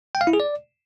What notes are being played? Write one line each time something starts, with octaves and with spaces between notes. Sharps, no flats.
G5
F5
E4
G#4
D5